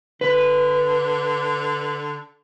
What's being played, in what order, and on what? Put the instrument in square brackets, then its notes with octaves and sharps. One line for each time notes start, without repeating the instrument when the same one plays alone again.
[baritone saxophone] D3 [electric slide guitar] B4